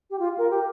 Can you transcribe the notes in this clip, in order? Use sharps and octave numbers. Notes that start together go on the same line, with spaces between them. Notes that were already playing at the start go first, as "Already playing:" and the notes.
G4
F4
A#4
G4